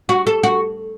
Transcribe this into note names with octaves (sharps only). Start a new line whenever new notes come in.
F#4
A4
F#4